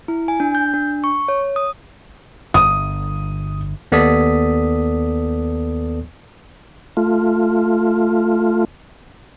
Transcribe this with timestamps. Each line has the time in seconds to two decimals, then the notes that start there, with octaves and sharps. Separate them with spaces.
0.08 E4
0.28 G#5
0.40 D4
0.55 G6
0.74 D4
1.04 C#6
1.28 C#5
1.56 D#6
2.54 G1 D#6
3.92 D#2 B3 A4 D5 D#6 B6
6.97 A3 F4